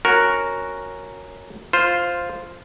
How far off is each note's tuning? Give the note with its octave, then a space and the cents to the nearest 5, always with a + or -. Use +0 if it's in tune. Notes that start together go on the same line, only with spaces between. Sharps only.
C#4 +0 F#4 +0 A#4 +0
F4 +0 C5 +0